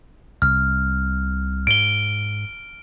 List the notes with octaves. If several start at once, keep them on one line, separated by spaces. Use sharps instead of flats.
C2 F6
G#2 D7 G7